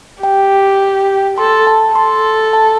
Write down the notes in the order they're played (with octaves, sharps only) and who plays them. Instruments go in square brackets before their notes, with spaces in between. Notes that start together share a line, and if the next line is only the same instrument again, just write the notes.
[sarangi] G4 [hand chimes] G5
[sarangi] A4 [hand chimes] C6
[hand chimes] A5
[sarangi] A4 [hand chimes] C6
[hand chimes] A5